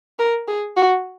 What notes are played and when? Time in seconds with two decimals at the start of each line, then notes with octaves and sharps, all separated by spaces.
0.19 A#4
0.48 G#4
0.77 F#4